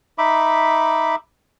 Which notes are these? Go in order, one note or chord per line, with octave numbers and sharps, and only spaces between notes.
D#4 E5 B5 D6